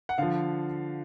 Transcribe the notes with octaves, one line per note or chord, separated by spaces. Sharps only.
F#5
D3 F3 F5